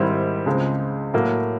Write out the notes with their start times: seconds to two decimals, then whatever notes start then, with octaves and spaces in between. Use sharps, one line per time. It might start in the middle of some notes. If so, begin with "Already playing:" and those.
Already playing: G#2 D#3 G3 C4 E4
0.46 C#2 C#3 F3 G#3 C4
1.14 A2 F#3 A#3